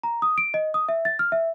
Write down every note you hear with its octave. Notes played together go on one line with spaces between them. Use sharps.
A#5
D#6
D7
D#5
D#6
E5
A6
F6
E5